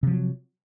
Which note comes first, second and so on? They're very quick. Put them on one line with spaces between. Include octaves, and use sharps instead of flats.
C3 F3 F#3